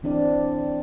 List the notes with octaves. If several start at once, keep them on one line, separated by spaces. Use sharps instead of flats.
E3 C4 D4 E4 D5